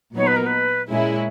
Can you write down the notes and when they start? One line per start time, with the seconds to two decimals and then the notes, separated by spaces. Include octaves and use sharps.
0.16 A#2 F#3 B3 D#4 C#5
0.26 B4
0.36 A#4
0.46 B4
0.90 A#2 G#3 C#4 E4